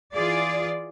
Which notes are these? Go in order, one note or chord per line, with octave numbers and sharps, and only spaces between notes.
E3 F4 G#4 D5